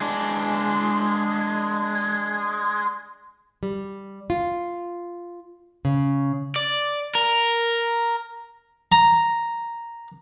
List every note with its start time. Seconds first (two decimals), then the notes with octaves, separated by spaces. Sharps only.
0.01 G#3 D4
3.63 G3
4.30 F4
5.85 C#3
6.56 D5
7.15 A#4
8.92 A#5